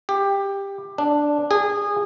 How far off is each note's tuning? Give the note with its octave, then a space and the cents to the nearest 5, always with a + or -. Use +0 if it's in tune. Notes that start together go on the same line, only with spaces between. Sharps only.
G4 +15
D4 +0
G#4 -25